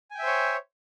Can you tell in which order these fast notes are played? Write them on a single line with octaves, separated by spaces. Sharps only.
G#5 G5 E5 C5 C#5